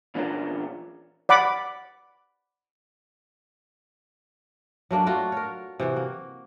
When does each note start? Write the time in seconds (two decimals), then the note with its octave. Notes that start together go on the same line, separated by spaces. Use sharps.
0.15 A#2 E3 C#4 D4 F4 A#4
1.29 D5 F#5 B5 D6
4.91 F#3 A3 A#3 D4
5.07 A3 F4 F#4
5.32 A#4 C#5
5.80 C3 E3 F#4
5.96 A#3